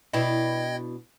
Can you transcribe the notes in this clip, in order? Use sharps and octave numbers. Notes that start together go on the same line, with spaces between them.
B2 D4 E4 D#5 G5 G#6